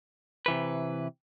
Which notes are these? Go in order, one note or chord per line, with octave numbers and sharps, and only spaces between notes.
C3 E3 B4